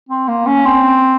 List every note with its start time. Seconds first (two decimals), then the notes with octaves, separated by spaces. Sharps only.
0.09 C4
0.28 A#3
0.47 C#4
0.65 C4